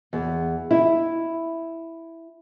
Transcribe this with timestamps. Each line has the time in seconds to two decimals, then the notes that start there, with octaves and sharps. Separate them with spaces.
0.13 E2
0.71 E4